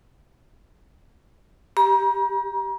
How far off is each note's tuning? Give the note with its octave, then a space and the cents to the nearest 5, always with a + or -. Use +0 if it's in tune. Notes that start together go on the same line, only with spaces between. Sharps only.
G4 +0 A#5 +35